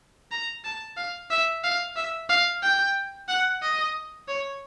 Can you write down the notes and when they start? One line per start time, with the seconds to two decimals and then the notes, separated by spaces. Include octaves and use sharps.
0.31 A#5
0.64 A5
0.97 F5
1.30 E5
1.64 F5
1.96 E5
2.29 F5
2.62 G5
3.28 F#5
3.62 D#5
4.28 C#5